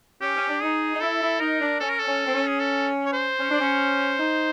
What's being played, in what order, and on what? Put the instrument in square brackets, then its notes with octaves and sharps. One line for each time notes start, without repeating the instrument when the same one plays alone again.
[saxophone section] C#4 [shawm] G4
[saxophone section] C#4
D4
[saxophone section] D#4 [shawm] G#4
[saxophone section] D#4
[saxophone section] E4 [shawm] A4
[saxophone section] E4
[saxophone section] D#4 [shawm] A#4
[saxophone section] D4
[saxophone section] C#4 [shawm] A4
[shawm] A#4
A4
[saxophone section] C#4
C4
C#4
[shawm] G#4
A4
C#5
C5
[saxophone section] C#4
D4
C#4
D#4